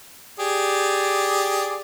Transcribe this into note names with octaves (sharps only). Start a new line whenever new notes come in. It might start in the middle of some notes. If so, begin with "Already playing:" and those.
G4 G#4 D5